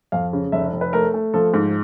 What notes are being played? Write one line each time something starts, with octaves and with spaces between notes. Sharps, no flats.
F2 F5
C#3
F1 E5
F1
B4
A3 A#4
A3
F3 A4
G#2